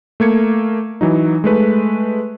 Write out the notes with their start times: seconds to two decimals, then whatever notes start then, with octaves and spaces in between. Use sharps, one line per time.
0.20 A3 A#3 G#6 C#7
1.01 E3 F#3 D#4
1.44 G#3 A3 B4